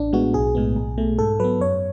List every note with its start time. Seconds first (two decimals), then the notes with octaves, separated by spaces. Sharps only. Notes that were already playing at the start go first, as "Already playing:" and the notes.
Already playing: A1 D4
0.13 A2 G#3 B3 F#4
0.34 B1 G#4
0.55 A2 G#3 B3
0.76 B1
0.98 B2 A3
1.19 G#2 A4
1.39 F#3 B3 B4
1.61 F#2 C#5